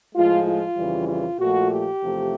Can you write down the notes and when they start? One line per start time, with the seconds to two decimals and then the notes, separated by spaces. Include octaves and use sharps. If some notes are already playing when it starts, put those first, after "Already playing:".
0.15 A2 F3 G#3 F4
0.46 F4
0.76 F2 C#3 E3 G3
1.08 F4
1.39 A#2 F3 A3 F#4
1.69 G4
2.00 E2 C3 F3 A3